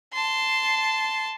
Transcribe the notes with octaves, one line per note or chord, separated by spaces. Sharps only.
A5 C6